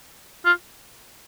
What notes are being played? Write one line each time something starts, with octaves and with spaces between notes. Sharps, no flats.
F4